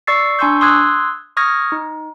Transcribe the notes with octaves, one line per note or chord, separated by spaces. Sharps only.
D5 C#6 E6 A6 C7
D4 G#5 C6 C#6 E6 G6
C6 D#6 E6 F#6 G#6
C#6 D#6 F6 G#6 A#6
D#4